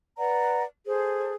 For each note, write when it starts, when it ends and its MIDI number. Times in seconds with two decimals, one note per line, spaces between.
0.18 0.63 71
0.18 0.63 74
0.18 0.63 78
0.18 0.63 82
0.86 1.33 68
0.86 1.33 69
0.86 1.33 72